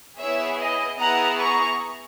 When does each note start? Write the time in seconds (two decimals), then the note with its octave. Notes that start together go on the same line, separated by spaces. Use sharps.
0.18 B3 E4 G#4 C#5 E5
0.59 D#5
0.99 B3 E4 G#4 F#5 A#5
1.39 A#5 C#6